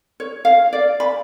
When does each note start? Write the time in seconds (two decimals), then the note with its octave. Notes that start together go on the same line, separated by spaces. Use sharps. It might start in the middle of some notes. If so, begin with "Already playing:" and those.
0.20 C#5
0.45 F5
0.73 D5
1.00 B5